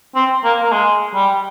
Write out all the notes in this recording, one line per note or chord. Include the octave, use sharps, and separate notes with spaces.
C4
A#3
A#3
G#3
G3